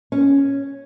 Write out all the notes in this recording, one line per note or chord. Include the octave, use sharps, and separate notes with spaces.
C#4